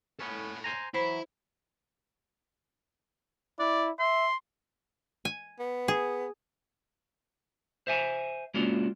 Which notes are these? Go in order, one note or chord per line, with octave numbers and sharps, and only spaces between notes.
B3 C#4 A4 C#5
C5 G#5 A#5
E3 F#3 E4 C5 B5
E4 D5
E5 C6
G#5
B3
G#4
C5 E5 G#5
G#3 A#3 C#4 D4 F4 F#4